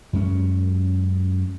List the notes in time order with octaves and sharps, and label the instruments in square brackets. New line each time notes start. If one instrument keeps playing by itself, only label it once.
[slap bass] F#2 G#3 C#4